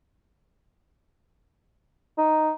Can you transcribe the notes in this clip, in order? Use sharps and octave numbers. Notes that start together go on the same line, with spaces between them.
D#4